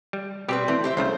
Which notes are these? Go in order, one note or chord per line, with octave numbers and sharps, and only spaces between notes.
G3
B2 G3 C4 G4 B4
E3 A3 C4
G4 C5 E5
C2 C#3 A3 C5